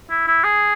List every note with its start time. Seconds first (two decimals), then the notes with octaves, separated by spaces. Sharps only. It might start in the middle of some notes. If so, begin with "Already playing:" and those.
0.10 E4
0.28 E4
0.44 G#4